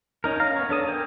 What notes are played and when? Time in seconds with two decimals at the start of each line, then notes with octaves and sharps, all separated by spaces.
0.24 C#4 D#4 A#4
0.40 F5 A#5 F6
0.56 B3 C#5
0.69 B3 D4 A4 D#6
0.87 A#4 G5 G#5